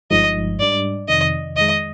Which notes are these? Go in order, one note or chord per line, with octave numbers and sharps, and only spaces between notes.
G1 G2 F3 G#3 D#4 D#5
G#2 G3 D4 D5
F2 C3 D#3 D#5
F2 D#3 G#3 D#5